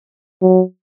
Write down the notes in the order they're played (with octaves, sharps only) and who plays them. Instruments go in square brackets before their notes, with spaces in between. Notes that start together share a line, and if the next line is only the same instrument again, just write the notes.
[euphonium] F#3